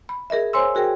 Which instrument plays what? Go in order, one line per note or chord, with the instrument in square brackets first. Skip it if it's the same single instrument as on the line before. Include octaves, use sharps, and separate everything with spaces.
[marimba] B5
G#4 A#4 D#5 E5
C5 C#5 G#5 C6 E6
F#4 G#4 A#4 G5